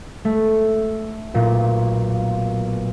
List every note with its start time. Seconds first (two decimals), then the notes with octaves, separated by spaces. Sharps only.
0.25 A3
1.34 B1 A#2